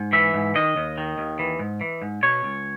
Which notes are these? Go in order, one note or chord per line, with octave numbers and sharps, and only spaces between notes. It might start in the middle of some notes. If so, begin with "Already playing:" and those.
Already playing: G#2
E3 E5
G#2
D#3 D#5
D#2
D#3
D#2
E3
G#2
E3
G#2
B2 C#5
C#2